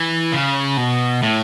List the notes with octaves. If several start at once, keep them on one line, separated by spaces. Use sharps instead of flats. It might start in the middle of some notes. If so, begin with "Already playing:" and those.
Already playing: E3
C#3
B2
A2